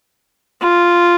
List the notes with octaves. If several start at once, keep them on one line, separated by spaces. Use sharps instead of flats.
F4